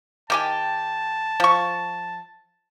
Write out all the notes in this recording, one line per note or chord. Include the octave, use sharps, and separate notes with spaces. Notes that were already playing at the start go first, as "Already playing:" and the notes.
D#3 G4 G#5 A5
F3 C#6